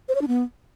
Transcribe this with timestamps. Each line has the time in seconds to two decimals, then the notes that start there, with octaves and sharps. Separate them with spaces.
0.09 C5
0.15 C#5
0.21 D4
0.28 B3